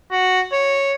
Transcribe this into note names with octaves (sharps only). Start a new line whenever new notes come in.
F#4
C#5